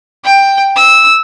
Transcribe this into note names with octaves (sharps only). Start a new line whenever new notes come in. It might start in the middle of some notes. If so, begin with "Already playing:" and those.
G5
E6